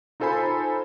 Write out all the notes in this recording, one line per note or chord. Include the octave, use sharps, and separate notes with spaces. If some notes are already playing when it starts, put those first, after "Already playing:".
D#4 F4 A4 C5 G#5 B5